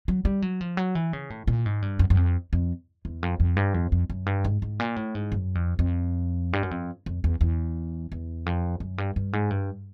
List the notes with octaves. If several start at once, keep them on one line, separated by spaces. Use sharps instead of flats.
F#3
G3
F#3
F3
F#3
E3
C#3
A2
A#2
G#2
G2
F#2
F#2
F2
F2
E2
F2
F2
G2
F2
F2
F#2
G2
G#2
G#2
A#2
A2
G#2
F#2
F2
F2
G2
F#2
F2
F2
E2
E2
E2
F2
F#2
G2
G2
G#2
G2